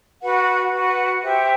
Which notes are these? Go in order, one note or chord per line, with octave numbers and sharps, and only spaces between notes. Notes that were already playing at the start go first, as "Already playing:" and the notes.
F#4 B4 F#5
F#4 B4 F#5
G4 C5 E5